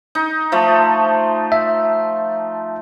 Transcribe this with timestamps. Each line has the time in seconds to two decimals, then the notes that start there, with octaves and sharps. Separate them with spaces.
0.15 D#4
0.52 F3 A3
1.52 E5